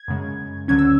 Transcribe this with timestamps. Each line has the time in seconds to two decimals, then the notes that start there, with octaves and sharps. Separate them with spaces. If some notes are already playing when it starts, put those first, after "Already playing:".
Already playing: G#6
0.08 F#2 C#3 G#3
0.68 D2 D3 F#3 C#4 G#6
0.79 E6